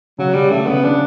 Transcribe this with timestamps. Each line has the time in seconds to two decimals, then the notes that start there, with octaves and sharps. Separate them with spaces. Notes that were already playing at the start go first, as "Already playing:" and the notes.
0.18 C#3 F#3
0.34 C#3 G3
0.50 C#3 A3
0.67 C#3 B3
0.83 C#3 D4